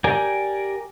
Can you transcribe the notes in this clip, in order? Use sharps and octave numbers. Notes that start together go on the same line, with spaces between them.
G4 A#4 D5 G#5